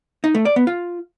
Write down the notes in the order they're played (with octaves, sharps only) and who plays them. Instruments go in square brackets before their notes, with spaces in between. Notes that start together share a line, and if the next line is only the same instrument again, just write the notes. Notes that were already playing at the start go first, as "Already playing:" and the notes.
[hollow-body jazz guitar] D#4
A3
D5
B3
F4